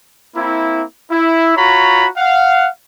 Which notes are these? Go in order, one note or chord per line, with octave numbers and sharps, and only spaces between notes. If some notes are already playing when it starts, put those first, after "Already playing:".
A#3 C4 E4
E4
F4 F#4 C#5 A#5 B5
F5 F#5